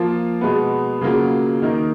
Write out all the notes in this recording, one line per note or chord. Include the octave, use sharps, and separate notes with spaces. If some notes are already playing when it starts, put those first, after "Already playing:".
Already playing: F3 A#3 F4
B2 G#3 B3
C#3 F#3 A#3 F4 G#4
D#3 A#3 D#4 A#4